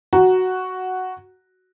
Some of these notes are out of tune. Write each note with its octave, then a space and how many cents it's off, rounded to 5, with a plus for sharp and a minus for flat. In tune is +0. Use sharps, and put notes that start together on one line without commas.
F#4 +0 A#5 +0